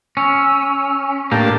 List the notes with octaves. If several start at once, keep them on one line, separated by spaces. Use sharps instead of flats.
C#4 E6
A2 A#3 D4 G4 A5